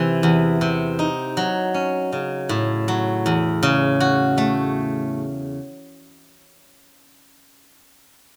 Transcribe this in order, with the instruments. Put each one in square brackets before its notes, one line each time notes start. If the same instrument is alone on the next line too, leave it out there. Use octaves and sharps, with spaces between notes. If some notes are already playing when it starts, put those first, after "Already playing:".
Already playing: [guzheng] C3 E3
E2
C3
D#4
F#3
C#4
C#3
A2
F#3
E2
C#3
F#4
A3